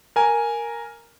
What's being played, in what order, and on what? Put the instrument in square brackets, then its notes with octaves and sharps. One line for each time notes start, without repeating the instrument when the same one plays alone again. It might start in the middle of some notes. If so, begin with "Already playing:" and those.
[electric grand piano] A#4 G#5